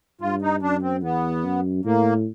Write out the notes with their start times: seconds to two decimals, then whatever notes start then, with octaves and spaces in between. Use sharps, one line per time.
0.21 G2 F4
0.42 D#4
0.62 F#2 D4
0.82 C4
1.03 E2 B3
1.44 F#2
1.85 A2 A#3